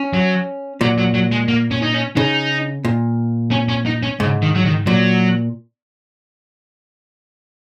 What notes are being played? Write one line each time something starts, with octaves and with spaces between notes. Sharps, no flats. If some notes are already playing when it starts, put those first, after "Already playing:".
Already playing: C#4
F#3
A#2 F#3
F#3
F#3
G#3
A#3
C#4
D#4
C#4
C#3 D#4
A#2
C#4
C#4
D#4
C#4
G#2 C#3
D#3
F#3
D#3
A#2 F#3